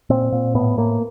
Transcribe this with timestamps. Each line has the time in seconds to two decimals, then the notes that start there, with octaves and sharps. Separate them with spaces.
0.10 A#2 C4
0.32 A#2
0.55 A2 B3
0.77 A2 A#3